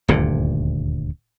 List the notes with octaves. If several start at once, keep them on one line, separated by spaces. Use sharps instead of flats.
D#1 D2 G2 A#2